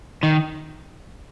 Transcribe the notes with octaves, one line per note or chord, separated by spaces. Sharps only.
D#3